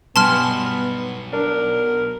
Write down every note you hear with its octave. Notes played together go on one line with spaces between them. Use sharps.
B1 G2 B2 B3 G#5 A5 C6 F6
D4 A#4